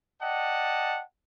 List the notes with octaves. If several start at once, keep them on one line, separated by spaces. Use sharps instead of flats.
D5 D#5 F#5 G5 A5